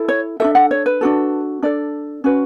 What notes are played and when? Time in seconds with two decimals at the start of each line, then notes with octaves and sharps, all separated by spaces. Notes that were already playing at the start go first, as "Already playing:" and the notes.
Already playing: E4 A4
0.08 C#5
0.40 D4 F#4 A4 E5
0.55 F#5
0.71 C#5
0.86 B4
1.01 D4 F#4 A4
1.63 D4 A4 D5
2.24 C#4 F#4 B4